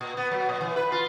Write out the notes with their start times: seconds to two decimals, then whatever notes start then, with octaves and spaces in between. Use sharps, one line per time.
0.01 A#2
0.17 B3
0.31 F#3
0.49 A#2
0.61 E3
0.76 B4
0.92 F4